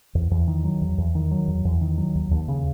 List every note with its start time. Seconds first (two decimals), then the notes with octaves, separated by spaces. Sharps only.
0.15 E2
0.31 E2
0.48 D#3
0.64 F#3
0.81 E2
0.98 E2
1.15 D#3
1.31 F#3
1.47 E2
1.65 E2
1.81 D#3
1.98 F#3
2.15 D#2
2.31 D#2
2.48 C#3